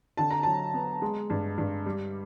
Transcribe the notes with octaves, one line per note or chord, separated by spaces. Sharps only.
D3 A5
A#5
F#3 A5
B3
G#3
G2
G2
G3